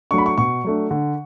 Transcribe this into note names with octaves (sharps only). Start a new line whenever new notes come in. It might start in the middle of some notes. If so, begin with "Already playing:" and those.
F#3 A3 D4 C#6
B5
C#6
B2 C#6
F#3 A3 D4
D3